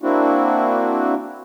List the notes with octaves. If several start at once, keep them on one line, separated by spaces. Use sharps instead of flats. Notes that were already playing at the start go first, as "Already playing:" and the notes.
A#3 C4 D4 E4 F#4